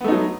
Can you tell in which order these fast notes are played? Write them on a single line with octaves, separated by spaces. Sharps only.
B3 A3 D#4 F#3